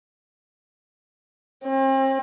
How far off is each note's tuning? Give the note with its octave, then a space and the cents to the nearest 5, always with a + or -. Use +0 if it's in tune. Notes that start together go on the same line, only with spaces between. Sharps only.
C4 +40